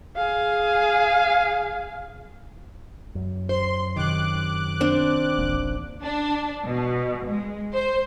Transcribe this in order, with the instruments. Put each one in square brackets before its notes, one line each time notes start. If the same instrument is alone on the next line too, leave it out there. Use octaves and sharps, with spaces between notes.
[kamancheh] G#4 F5
[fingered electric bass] F#2
[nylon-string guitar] C5 [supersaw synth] C6
[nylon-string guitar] C3 D#3 [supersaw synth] D6 F#6
[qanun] C4 D4
[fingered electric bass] D1 A1 A#3
[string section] D4
B2
G#3
C5